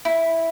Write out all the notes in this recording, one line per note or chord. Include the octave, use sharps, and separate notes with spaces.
E4